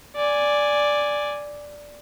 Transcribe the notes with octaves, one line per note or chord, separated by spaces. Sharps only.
D5 G#5